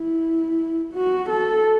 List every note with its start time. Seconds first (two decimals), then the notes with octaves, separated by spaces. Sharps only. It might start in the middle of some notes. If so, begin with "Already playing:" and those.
Already playing: E4
0.93 F#4
1.29 A4